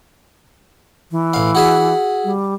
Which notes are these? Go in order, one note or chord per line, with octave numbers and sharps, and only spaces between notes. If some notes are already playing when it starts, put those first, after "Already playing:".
E3
A1 F5
F#4 G#4 E5
G3